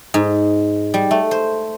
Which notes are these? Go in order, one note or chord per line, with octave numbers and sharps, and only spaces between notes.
G#2
G3
A3
C5